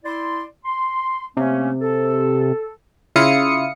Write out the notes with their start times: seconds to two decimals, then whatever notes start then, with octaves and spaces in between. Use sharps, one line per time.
0.04 E4 D5 C6
0.65 C6
1.37 C3 A3 A#3 C#4
1.81 A4
3.16 C#3 E4 F4 F5 D#6 C#7